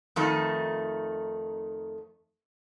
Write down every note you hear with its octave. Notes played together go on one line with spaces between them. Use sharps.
F2 D#3 A3 D#4